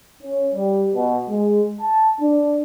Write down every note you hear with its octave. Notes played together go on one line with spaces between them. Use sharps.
C#4
G3
B2
G#3
A5
D4